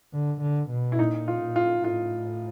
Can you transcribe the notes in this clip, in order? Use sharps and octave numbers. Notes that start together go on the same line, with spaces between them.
D3
D3
B2
E4
A#2 D#4
F4
A#2
F4
A2 F4